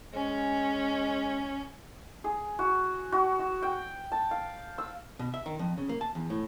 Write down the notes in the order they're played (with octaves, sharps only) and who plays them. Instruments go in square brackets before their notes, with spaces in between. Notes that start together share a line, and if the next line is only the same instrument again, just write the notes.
[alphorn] G#3 [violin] C#4
[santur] G#4
F#4
F#4
F#4
G5
A5
F5
E6
[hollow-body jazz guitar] B2
E5
D#3
F2
C#3
A#3
A5
E2
A2